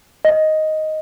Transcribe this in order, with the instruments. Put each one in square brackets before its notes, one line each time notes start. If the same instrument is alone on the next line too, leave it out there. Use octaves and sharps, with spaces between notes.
[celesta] D#5